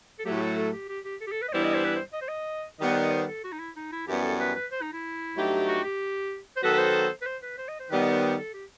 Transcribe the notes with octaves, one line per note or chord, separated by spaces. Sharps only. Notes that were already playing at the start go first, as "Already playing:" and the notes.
A4
A2 F#3 A3 G4
G4
A4
A4
G4
G4
G4
A4
G4
A4
B4
D#5
G2 E3 G3 B3 E4 C5
D#5
C5
B4
C5
D#5
C5
D#5
D#3 G3 B3 D#5
C5
D#5
C5
A4
F#4
D#4
E4
D#4
E4
F#2 E3 G3 B3 G4
A4
B4
B4
C5
D#4
E4
G2 F#3 A3 D#4 G4
F#4
G4
C5
D#3 F#3 B3 F#4 A4 B4
B4
C5
B4
C5
B4
C5
D#5
C5
D#3 G3 B3 B4
D#5
C5
C5
A4
G4